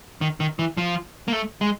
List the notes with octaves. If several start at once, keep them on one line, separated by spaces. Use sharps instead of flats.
D#3
D#3
E3
F3
A#3
A3
G#3